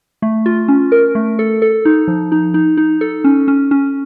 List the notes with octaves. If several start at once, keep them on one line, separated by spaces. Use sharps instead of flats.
A3
F4
C#4
A#4
A3
A4
A4
D#4
F3
D#4
D#4
D#4
A4
C#4
C#4
C#4